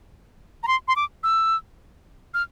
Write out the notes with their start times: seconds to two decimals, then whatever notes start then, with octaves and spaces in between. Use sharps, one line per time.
0.63 A#5
0.68 C6
0.88 C6
0.96 D6
1.23 E6
2.34 F6